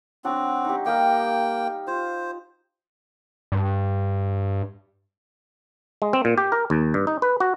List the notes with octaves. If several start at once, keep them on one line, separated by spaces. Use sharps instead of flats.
F#3 C4 D4 F#4
D#4 G4
G3 A#3 D#5 F5 G5
F4 C5
G2
G#3
C4
A#2
G4
A#4
D#2
G2
D#4
B4
F#4